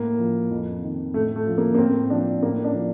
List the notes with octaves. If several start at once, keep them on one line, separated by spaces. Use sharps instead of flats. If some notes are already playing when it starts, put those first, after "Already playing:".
Already playing: A2 A#3
F3
F2
D#3
A2 A3
A3
F3
A#3
A#3
A2 C4
F3 D4
A2 A#3
D4
F3